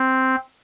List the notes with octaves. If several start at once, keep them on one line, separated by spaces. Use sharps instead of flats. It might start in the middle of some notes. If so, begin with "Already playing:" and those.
Already playing: C4